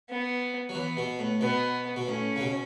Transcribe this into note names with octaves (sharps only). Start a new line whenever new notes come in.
B3
F#3
E3 B3
B2
A2
B2 B3
B2
A2 C#4
C#3
B2